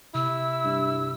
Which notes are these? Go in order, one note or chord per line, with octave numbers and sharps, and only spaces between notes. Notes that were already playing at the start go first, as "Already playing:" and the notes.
C3 E4 E6
G2